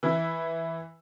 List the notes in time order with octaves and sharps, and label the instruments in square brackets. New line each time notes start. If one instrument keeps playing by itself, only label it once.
[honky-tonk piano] E3 E4